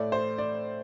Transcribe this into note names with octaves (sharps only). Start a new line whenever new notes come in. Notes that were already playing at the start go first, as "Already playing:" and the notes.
Already playing: A2 A3 D5
C5
D5